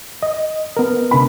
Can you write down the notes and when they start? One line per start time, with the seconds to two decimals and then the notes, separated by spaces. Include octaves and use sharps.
0.23 D#5
0.77 B3 A#4
1.11 D3 B5